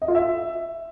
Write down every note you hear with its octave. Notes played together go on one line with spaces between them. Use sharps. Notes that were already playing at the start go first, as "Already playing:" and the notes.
D#5
F4
E5